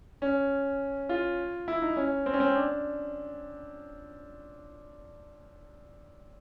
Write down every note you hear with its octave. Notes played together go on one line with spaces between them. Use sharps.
C#4
F4
E4
D#4
C#4
C4
C#4
C4
D4